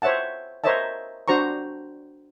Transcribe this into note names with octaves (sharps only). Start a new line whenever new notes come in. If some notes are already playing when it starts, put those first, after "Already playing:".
C5 C#5 E5 F#5 A5
A#4 C5 C#5 D#5 E5 A5
D4 F#4 C5 A#5 C#6